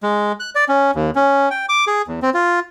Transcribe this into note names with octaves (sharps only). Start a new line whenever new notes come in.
G#3
F#6
D5
C#4
D#2
C#4
G5
D6
G#4
E2
C4
F4